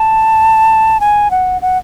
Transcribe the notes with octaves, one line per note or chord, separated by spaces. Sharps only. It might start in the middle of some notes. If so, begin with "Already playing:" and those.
Already playing: A5
G#5
F#5
F#5